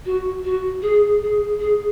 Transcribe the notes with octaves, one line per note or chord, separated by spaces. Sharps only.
F#4
F#4
G#4
G#4
G#4